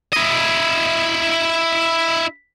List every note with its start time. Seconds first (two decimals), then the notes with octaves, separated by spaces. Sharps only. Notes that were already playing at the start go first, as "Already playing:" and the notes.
0.13 E4 D#5